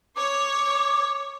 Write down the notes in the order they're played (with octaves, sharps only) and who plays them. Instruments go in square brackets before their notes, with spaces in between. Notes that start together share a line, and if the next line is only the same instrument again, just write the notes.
[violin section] C#5 [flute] D6